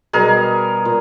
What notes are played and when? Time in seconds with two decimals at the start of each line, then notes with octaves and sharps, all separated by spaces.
0.13 B2 G3 G#4 A#4
0.85 A#2